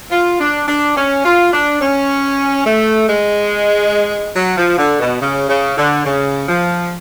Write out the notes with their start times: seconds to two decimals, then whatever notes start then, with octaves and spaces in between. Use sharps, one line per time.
0.11 F4
0.40 D4
0.67 D4
0.96 C#4
1.25 F4
1.53 D4
1.81 C#4
2.65 A3
3.08 G#3
4.35 F#3
4.57 F3
4.77 D3
5.00 B2
5.21 C#3
5.49 C#3
5.77 D3
6.05 C#3
6.48 F3